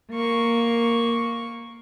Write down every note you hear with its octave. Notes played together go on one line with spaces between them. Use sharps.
A#3 C#6